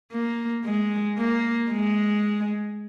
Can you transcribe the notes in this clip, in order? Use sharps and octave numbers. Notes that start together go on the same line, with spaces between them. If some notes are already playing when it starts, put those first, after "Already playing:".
A#3
G#3
A#3
G#3